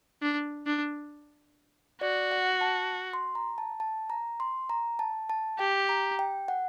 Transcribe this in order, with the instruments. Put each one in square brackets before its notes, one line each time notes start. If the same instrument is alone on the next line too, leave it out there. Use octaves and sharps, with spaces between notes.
[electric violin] D4
D4
[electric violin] F#4 [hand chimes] D5
[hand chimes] F#5
A5
C6
A#5
A5
A5
A#5
C6
A#5
A5
A5
[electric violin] G4 [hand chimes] G5
[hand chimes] A#5
G5
F#5